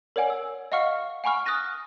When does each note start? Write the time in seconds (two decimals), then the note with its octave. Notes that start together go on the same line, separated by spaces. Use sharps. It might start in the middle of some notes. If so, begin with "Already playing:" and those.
0.16 A#4 C#5 D5 F#5 G#5
0.30 E6
0.72 D#5 F5 F#5 C#6 F6 C#7
1.24 F#5 G#5 B5 C#6 F6
1.46 D#6 F6 F#6 A6 A#6 D#7